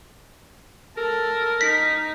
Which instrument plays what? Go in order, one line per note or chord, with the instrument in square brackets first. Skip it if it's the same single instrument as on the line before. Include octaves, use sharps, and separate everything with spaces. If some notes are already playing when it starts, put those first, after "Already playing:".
[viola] A4 [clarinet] A#4
[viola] D#4 [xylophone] B6